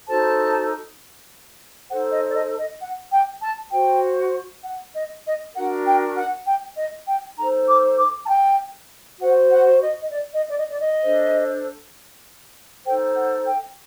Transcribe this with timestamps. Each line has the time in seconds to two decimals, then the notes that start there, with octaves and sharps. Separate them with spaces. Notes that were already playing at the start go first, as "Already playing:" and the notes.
0.07 D#4 F#4 A4 C5 A5
1.90 D#4 A4 C5 F#5
2.12 D#5
2.29 D5
2.35 D#5
2.58 D#5
2.81 F#5
3.12 G5
3.42 A5
3.72 F#4 C5 G5
4.64 F#5
4.94 D#5
5.25 D#5
5.55 D4 F#4 A#4 F#5
5.86 G5
6.16 F#5
6.46 G5
6.76 D#5
7.07 G5
7.37 D#4 A4 C5 A#5
7.69 D6
7.98 D6
8.24 A5
8.28 G5
9.20 F#4 C5 F#5
9.50 F#5
9.81 D#5
10.01 D#5
10.11 D5
10.34 D#5
10.49 D5
10.57 D#5
10.69 D5
10.80 D#5
11.03 D4 A4 C5
12.85 D#4 A4 C5 G5
13.16 F#5
13.47 G5